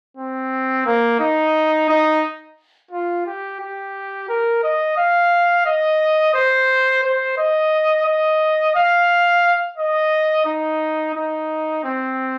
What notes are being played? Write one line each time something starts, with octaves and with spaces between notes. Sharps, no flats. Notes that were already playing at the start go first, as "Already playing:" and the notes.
C4
A#3
D#4
D#4
F4
G4
G4
A#4
D#5
F5
D#5
C5
C5
D#5
D#5
F5
D#5
D#4
D#4
C4